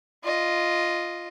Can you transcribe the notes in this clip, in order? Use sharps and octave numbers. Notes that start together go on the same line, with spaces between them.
F4 D#5